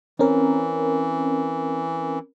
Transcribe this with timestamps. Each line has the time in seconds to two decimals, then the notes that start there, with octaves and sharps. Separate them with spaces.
0.19 E3 C4 C#4 A#4